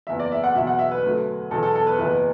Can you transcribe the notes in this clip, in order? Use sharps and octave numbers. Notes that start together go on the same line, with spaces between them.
F#1 E2 E3 E5
D5
E5
F#5
E2 B2 F#3 E5
F#5
E5
B4
D2 D3 F#3
E2 B2 F#3 A4
A4
A4
B4
F#1 E2 E3 B4